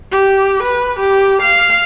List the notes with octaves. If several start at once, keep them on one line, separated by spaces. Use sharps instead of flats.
G4
B4
G4
F5